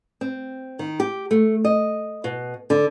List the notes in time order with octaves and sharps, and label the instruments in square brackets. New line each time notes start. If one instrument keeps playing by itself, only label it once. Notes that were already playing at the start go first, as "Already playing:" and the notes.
[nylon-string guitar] C4
D#3
G4
A3
D#5
B2
D3